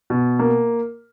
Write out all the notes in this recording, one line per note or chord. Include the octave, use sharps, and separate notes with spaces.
B2
A#3